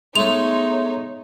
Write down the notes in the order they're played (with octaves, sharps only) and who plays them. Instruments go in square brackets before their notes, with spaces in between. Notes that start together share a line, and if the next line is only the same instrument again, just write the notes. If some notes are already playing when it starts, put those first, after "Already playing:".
[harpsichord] G#3 A3 [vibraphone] B3 E5 C6 [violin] D#4 C#5 [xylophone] F7